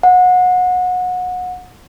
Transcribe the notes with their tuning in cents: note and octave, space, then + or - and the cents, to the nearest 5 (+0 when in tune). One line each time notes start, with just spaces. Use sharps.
F#5 -25